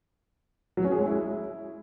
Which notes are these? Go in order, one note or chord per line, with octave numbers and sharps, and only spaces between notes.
F#3
C#4
G#4
G#3
E4